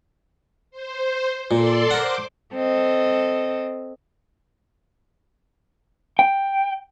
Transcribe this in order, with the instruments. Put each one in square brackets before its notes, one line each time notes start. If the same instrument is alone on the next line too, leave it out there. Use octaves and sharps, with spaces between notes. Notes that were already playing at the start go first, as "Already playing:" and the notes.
[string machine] C5
[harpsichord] A#2 [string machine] A4 D5 C6
[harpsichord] A#4 F#5 [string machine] C5 D6
[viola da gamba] C4 A4 D#5
[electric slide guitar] G5